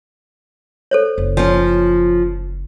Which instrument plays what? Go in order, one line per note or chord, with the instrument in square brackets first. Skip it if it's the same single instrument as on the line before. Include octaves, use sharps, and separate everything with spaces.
[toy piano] A4 C5 C#5
[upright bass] F#1
[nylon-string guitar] F3 C#4